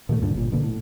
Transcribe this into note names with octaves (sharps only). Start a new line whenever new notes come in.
A#2 D#3 E3 A3
D2 G2 A#2 D3
G1 A#2
A#1 B2 D3 A#3
A2